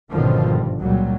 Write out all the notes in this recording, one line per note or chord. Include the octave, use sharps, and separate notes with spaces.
G#1 F#2 B2 D3 D#3 F3
G2
C#2 A#2 F#3 G3